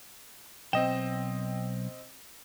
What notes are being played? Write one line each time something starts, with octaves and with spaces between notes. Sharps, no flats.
B1 C4 D#5 G5 E7